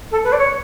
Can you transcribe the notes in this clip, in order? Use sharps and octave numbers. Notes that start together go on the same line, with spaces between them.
A4
B4
D5
C#5